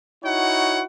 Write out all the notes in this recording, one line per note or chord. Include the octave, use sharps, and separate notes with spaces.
D#4 E4 F#4 C#5 F#5